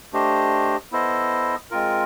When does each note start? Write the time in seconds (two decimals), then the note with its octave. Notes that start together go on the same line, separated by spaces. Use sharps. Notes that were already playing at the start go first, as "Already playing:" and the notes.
0.13 A3 D4 G4 C5 D#5
0.92 B3 E4 A4 C5 D#5
1.71 G#3 C4 F4 A#4